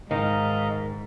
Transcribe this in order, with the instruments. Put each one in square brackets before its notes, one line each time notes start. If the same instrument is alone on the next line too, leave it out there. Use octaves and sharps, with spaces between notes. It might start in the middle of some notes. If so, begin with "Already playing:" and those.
[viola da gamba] G#2 [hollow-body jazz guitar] D#3 [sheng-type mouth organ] D#5 F5 A#5